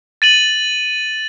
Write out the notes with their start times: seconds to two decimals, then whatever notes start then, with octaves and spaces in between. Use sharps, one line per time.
0.22 A6 D#7 F#7